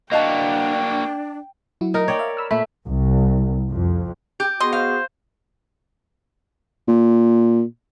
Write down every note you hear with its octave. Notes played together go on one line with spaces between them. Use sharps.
A#3 D4 F#4 D#5 F5 G5 A5
F#3 E4 F#4
D#4 A#4
C#5 D5 G5
E5 F5
B5 E6 F6
A#2 A3 B5
C2
F2
G4
B2 B3 F#4 G#4 D#5 C6
C5 F5
A#2